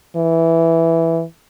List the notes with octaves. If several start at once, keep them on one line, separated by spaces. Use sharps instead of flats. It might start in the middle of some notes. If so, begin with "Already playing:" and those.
E3